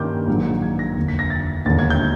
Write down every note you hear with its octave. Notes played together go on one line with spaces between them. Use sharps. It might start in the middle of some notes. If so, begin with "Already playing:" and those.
Already playing: G2 D#3 G3 A#3 C#4 C6 D6 G6
A#1 G#2 D#3 F#3
G#6
A#6
F1 D#2 D3
B6
A#6
A6
E1 D#2 D3 A6
G#6
G6